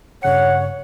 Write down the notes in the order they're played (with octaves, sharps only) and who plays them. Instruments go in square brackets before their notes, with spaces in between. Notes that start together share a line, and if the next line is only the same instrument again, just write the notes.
[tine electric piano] G2 C#3 C#7 [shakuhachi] C#5 [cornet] F#5